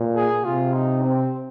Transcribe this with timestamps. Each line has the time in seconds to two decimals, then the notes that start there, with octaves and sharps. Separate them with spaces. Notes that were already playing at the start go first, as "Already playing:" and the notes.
Already playing: A#2
0.15 G#4
0.44 C3 F4
0.73 D#4
1.01 C4